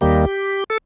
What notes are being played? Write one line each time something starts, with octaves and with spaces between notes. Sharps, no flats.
D#2 D#3 G3 A#3 G4
A4